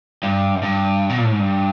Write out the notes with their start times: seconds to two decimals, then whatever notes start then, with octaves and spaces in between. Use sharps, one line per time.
0.23 G2
0.55 F#2
0.63 G2
1.10 B2
1.18 A#2
1.24 A2
1.31 G#2
1.39 G2